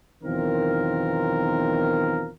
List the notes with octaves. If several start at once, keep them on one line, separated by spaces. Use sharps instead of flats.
B1 E2 D#3 C4 F4 A#4